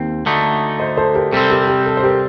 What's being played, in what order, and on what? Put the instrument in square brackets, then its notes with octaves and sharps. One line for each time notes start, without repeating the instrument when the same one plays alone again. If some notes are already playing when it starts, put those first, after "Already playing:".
Already playing: [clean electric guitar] D#2 C4
D2 D3 A3 D#4
[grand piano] C5 D#5
A4 C5
G4 A#4
[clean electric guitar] C3 G3 C4 [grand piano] A4
[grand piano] G4 A#4
A4
G4
A4
C5
G4 A#4